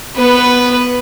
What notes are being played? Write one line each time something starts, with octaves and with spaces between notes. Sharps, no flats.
B3 B4